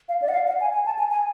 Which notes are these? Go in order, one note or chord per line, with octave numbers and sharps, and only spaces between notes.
F5
D5
F#5
F5
F#5
G#5
G#5
A5
G#5
G#5